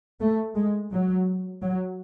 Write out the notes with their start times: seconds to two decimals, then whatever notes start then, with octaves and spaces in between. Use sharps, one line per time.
0.21 A3
0.55 G#3
0.91 F#3
1.62 F#3